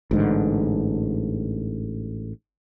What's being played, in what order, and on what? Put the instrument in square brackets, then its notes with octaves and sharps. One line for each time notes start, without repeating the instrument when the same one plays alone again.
[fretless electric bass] A1 G#2 D3